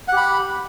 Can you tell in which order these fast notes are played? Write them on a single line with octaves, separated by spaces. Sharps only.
F#5 G4 B5